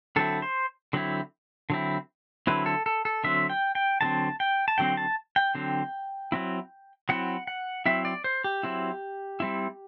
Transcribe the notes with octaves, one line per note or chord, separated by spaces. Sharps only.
D3 F#3 C4 E4 A4
C5
D3 F#3 C4 E4
D3 F#3 C4 E4
D3 F#3 C4 E4 B4
A4
A4
A4
D3 F#3 C4 E5
G5
G5
D3 F#3 C4 A5
G5
A5
D3 F#3 C4 G5
A5
G5
D3 F#3 C4
F#3 C4 E4
F#3 C4 E4 F#5
F#5
F#3 C4 E4 E5
D5
C5
G4
F#3 C4 E4
G3 C4 E4